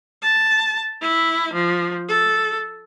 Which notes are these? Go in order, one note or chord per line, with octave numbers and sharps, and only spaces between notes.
A5
E4
F3
A4